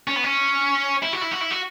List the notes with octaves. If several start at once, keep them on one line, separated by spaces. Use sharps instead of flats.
C#4
B3
C#4
E4
F#4
E4
F#4
E4
F#4